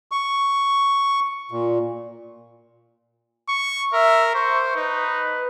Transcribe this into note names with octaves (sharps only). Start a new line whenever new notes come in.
C#6
A#2
C#6
A#4 E5
C5 C#6
D#4 B4